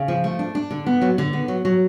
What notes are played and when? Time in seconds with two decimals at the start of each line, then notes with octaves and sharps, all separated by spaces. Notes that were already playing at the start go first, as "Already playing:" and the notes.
Already playing: C#3
0.08 F3
0.24 A3
0.39 D4
0.55 D4
0.71 D3
0.86 B3
1.02 F#3
1.18 D3
1.33 B3
1.48 F#3
1.65 F#3